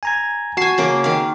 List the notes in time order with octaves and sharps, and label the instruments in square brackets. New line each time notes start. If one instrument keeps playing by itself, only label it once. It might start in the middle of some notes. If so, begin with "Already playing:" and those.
[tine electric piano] G#5 A#5 G#6
[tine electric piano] F#4 C7 [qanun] G#5 A5
[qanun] C#3 A#3 D6
D#3 F5